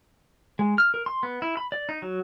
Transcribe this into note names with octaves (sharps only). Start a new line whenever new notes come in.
G#3
F6
A#4
C6
B3
E4
B5
D5
D#4
F#3